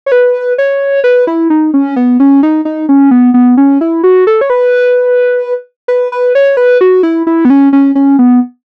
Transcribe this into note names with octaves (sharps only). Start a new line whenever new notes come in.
C#5
B4
C#5
B4
E4
D#4
C#4
B3
C#4
D#4
D#4
C#4
B3
B3
C#4
E4
F#4
A4
C#5
B4
B4
B4
C#5
B4
F#4
E4
E4
B3
C#4
C#4
C#4
B3